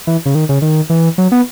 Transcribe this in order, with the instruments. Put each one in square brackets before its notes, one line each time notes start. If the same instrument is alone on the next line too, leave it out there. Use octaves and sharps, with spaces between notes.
[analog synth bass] E3
C#3
D#3
C#3
D#3
E3
F#3
B3